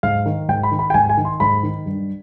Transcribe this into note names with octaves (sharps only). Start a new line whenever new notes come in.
G#2 F5
D#3
G#2 G5
B5
D#3
B5
G5
G#2 G#5
G#5
D#3
C6
G#2 B5
D#3
G2